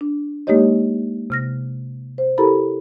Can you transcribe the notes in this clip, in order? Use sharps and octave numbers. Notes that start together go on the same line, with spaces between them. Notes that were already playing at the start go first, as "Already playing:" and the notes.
D4
G#3 A#3 D#4 G4 C#5 D#5
C3 F6 A#6
C5
E4 G4 A4 A#4 A#5 B5